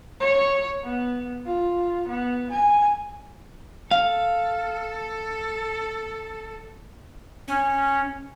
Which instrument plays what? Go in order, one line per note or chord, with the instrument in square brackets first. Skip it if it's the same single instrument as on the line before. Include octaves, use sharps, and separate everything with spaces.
[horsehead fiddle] C#5
B3
F4
B3
G#5
[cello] A4 [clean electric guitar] F5
[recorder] C#4